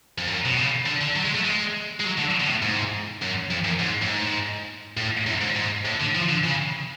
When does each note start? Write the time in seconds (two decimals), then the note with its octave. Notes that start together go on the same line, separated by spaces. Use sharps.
0.18 F2
0.27 F#2
0.45 B2
0.57 C#3
0.86 D3
1.01 D3
1.16 F#3
1.25 G#3
1.35 A3
1.44 G#3
2.00 G#3
2.04 F#3
2.18 D3
2.40 B2
2.48 A2
2.62 G#2
3.22 F#2
3.51 F2
3.64 F#2
3.79 G#2
4.02 A2
4.09 G#2
4.97 A2
5.27 F#2
5.41 G#2
5.56 G#2
5.85 A2
6.00 D3
6.15 F3
6.29 D3
6.44 C#3